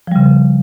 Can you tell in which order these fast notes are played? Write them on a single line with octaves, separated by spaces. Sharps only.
F3 G3 C#3